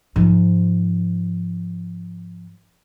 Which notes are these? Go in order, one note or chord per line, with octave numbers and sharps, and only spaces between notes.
G#2 F3